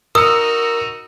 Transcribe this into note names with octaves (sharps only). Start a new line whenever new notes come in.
D#4 F#4 A#4 D#6 E6 C#7